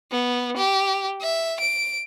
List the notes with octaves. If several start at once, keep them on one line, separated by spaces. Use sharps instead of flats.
B3
G4
E5
D7